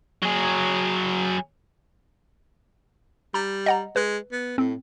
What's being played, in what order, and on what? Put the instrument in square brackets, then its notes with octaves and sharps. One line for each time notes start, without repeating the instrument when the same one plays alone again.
[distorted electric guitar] F#3 G#4
[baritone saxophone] G3 [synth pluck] A#5
[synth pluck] D#5 F#5 A#5
[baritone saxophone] G#3 [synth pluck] B4
[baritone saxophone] B3
[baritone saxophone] A2 [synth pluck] C4